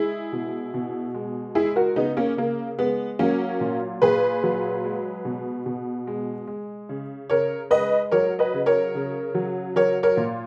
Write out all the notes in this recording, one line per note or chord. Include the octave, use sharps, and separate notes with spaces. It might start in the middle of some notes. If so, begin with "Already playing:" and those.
Already playing: G#3 E4 G#4
B2
B2
G#3
G#3 E4 G#4
F#4 A#4
C#3 B3 D#4
A#3 C#4
C#3 A#3
G#3 B3
F#3 A#3 C#4
A#2
A#2 G#4 B4
F#3
G#3
B2
B2
G#3
G#3
C#3
C#3 A#4 C#5
G#3 B4 D#5
F#3 A#4 C#5
B4 D#5
C#3
A#4 C#5
C#3
F#3
F#3 A#4 C#5
A#4 C#5
A#2